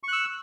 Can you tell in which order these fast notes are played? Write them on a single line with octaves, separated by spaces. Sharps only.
C#6 F#6 E6